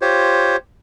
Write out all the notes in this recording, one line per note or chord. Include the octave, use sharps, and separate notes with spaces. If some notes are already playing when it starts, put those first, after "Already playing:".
F4 G4 C5 C#5